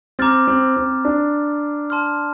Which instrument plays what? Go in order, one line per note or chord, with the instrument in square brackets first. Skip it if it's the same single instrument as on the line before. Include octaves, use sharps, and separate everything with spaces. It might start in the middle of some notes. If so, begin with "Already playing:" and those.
[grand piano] C4 [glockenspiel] A#5 D6 F6 A6
[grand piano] C4
C4
D4
[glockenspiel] A5 C6 F6